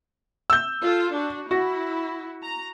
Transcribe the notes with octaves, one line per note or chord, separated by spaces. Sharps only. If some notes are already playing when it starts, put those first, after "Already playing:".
E6 G6
F4 A4
D4 F#4
E4 F#4
A#5